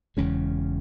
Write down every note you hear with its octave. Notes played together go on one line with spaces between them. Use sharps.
E1 E2 C#3 G#3 C#4